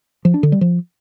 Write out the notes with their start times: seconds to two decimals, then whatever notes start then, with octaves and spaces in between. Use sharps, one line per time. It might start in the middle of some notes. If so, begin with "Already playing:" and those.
0.25 F3
0.34 D4
0.43 D3
0.52 G3
0.61 F3